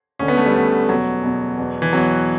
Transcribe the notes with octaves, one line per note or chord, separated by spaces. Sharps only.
D2 D3 C#4
B3
A3
G3
D2 D3
E2 B2 F#3
E2 B2
E2 B2
E3
E2 B2 F#3